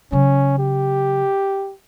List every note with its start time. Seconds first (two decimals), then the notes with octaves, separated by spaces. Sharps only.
0.12 C#3 F#3 C#4
0.59 G4